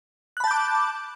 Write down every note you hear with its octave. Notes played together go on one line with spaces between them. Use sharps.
A5 B5 D6 F#6 G6